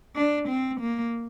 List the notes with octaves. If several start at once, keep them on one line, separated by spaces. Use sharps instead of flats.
D4
C4
A#3